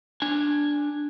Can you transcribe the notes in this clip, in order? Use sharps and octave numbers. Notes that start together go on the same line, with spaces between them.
D4 G#5